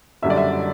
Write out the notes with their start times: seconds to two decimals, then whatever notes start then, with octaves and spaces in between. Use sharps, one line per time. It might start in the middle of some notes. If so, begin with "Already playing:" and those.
0.22 F#1 F#2 D3 G3 E5
0.30 D5
0.37 E5